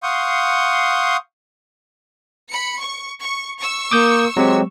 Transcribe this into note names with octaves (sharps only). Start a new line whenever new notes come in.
F5 F#5 C6 C#6 D#6 G6
B5 C#7
C#6
C#6
C#6 E6
A#3 D6 D#6 G6
F#3 G#3 C4 G4